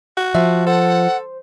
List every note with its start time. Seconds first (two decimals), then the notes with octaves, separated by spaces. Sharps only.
0.17 F#4
0.35 F3 E5
0.67 A4 C5 F#5